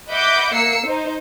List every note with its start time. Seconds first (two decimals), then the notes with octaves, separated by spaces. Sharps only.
0.11 D#5 E5 F#5 B5 D6 G6
0.54 A#3 E6 C7 C#7
0.87 D#4 C5